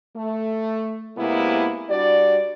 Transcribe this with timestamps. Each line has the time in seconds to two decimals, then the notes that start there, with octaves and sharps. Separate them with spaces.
0.17 A3
1.18 C3 G#3 A#3 B3 E4
1.90 G3 D4 F#4 D5